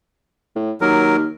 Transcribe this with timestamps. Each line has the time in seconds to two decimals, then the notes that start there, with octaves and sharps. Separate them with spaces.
0.56 A2
0.81 D#2 F#3 A#4